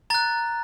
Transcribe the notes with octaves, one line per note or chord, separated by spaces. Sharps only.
A#5 F#6 A6